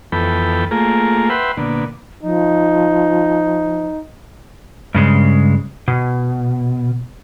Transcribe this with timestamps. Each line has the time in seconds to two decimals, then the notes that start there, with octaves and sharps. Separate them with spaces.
0.12 F2 E3 B3 A4 G5 B5
0.71 A3 A#3 F4 G#4 A#4
1.30 B4 E5 F#5 G5 B5 C6
1.57 A#2 D3 B3
2.23 F3 D#4
4.95 G2 C#3 G#3
5.88 B2